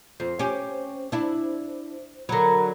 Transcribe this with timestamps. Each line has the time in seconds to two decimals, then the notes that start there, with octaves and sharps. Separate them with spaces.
0.20 F2 C5
0.39 C#4 G4
1.12 D4 E4
2.29 D3 F#3 A#4 A#5 B5